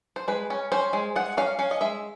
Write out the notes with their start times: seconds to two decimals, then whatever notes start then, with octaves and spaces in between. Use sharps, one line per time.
0.16 C5
0.28 G#3 B4
0.50 C#4
0.72 C#4 C5
0.93 G#3
1.16 G#3 F#5
1.37 C#4 F5
1.59 C#4 F5
1.71 D#5
1.81 G#3 E5